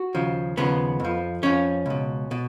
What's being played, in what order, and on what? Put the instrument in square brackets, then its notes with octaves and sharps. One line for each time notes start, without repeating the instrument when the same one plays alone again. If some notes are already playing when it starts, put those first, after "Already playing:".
Already playing: [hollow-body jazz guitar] F#4
D#2 C#3 F3
D#2 C#3 F3 B3
F2 F3
F2 F3 C#4
C#2 B2
B2